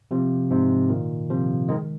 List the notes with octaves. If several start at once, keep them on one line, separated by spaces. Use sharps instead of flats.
C3 F3
G#2 C3
A#2 D#3
C3 F3
D#3 G#3